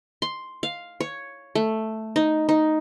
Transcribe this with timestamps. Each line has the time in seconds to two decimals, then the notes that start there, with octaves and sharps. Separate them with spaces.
0.22 C6
0.63 F5
1.00 C#5
1.55 A3
2.16 D#4
2.49 D#4